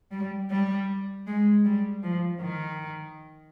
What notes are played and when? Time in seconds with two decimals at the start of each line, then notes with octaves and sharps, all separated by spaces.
0.11 G3
0.50 G3
1.27 G#3
1.65 G3
2.03 F3
2.41 D#3